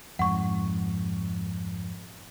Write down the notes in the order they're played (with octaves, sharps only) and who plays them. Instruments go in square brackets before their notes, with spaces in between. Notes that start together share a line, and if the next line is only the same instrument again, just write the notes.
[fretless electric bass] F2 G#2 [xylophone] F#5 C#6